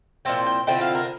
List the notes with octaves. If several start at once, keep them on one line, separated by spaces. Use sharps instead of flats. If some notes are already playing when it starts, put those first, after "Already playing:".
A#2 F3 C4 E4 G5
G5
D3 F3 C4 E4 G5
F5
A#4